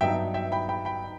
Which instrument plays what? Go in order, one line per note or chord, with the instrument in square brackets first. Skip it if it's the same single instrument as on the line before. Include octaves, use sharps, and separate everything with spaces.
[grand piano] G2 F#3 B3 D#4 E5 G5
E5 G5
G5 B5
G5 B5
G5 B5
D#4